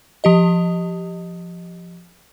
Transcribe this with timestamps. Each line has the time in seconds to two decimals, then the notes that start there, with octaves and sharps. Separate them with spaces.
0.24 F3 G4 D#5